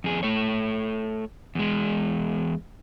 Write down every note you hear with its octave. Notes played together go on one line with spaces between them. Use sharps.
F2 G#4
A3 C#5
E2 G#3